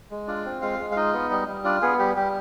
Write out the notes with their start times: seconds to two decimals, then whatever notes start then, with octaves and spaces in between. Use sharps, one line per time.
0.11 G#3
0.28 D4 F4 D5
0.45 C4
0.62 G#3 F4 F5
0.79 G#3
0.92 F5
0.96 D#4 F4 D#5
1.13 B3
1.31 G3
1.48 G3
1.64 D4 F4 D5
1.82 B3 G#4
1.99 G3 G4
2.17 G3 G4